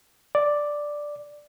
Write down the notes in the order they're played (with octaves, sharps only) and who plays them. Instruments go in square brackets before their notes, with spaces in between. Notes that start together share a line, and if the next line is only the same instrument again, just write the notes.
[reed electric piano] D5